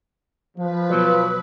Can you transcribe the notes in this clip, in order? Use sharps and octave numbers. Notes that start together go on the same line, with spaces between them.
F3 B4
B2 F#3